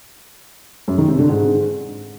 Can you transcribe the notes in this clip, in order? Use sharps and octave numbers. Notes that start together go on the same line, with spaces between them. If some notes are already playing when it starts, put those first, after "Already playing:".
F#2
D#3
C3
D3
G#2